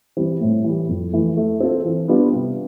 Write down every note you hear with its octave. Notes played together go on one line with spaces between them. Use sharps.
E3 G3 C4
A2
E3 G3
F2
E3 A3
A3
C4 F4 A4
E3
G3 B3 D4 F4
C3